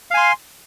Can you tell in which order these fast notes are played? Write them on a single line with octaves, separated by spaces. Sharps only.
F5 G#5 C6